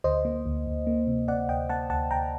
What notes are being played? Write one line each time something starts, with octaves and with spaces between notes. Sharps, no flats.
D2 C5 D#5
A#3
D2
D2
A#3
C3
C3 D5 F#5
D2 D#5 G5
A#3 F#5 A5
D2 F#5 A5
D2 G5 A#5